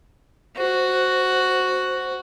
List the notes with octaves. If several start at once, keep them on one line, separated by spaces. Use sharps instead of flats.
F#4 C5